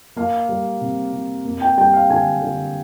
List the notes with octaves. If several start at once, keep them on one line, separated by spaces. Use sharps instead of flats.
A#3 F5
G3
C3
C3
A#3
G5
G3 G5
F5
D3 G#5
D3